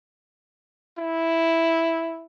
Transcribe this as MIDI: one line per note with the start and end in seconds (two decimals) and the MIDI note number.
0.98 2.26 64